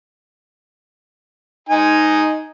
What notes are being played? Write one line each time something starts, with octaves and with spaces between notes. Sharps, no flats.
D#4 G#5